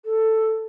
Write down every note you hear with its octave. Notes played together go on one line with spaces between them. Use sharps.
A4